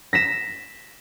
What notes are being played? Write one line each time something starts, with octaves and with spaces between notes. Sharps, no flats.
A#6 B6 E7